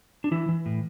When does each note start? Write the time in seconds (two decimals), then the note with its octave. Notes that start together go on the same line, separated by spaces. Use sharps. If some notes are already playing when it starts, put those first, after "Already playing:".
0.24 D4
0.31 E3 E4
0.49 E3
0.66 A2